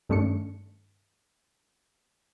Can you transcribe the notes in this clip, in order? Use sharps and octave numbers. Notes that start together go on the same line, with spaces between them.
G2 D#3 A3 C#4 D4 C#7